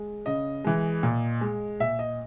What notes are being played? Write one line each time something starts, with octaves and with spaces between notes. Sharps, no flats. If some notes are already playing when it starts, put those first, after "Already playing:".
Already playing: G#3
C#3 D#5
E3 G#3
A#2
G#3
A#2 E5
D#5